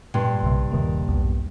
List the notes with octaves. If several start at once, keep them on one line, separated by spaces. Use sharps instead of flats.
G2 A#2 C#3 C6
B1 C3
D#1 C3 D#3 A#3
B1 E2